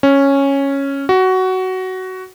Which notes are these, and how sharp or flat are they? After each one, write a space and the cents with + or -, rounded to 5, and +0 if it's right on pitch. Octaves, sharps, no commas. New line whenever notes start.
C#4 -5
F#4 +15